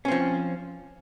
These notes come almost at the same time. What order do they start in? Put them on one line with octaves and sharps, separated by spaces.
C#4 C4 F3